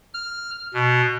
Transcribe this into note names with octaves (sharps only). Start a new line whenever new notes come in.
F6
B2